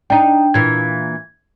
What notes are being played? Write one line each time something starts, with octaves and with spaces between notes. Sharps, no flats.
D4 D#4 G5
A#2 E3 G#6